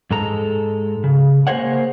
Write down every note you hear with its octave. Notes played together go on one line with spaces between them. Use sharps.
G#2 G#3 A4 A#5
C#3
A#3 G#4 A#4 C5 C#5 F#5